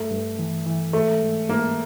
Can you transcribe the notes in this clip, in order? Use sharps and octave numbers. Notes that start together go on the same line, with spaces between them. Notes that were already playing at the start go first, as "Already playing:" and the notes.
Already playing: G2 A3
G2
E3
E3
G#2 A3
G#2
G#2 A#3